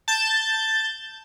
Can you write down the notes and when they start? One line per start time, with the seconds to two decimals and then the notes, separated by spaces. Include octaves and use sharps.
0.08 A5 G6 A6